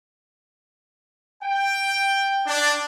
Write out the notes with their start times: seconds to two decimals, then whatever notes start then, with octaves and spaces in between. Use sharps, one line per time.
1.44 G5
2.47 D4